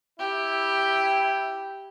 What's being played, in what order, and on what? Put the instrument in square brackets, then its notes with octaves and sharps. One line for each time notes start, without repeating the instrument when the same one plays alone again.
[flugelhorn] E4 [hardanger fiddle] G4